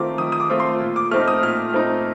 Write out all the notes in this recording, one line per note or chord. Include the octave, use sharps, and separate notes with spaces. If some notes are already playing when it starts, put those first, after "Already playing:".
Already playing: D#3 A3 C4 F4 D6
D#3 D#6
D#6
D6
A3 C4 F4
C6
A#2
D6
A3 C4 D#4 F6
D#6
A#2 F6
A3 C4 D#4